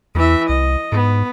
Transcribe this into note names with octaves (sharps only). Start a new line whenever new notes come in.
E2 E3 E5
C2 D#5
G#2 B3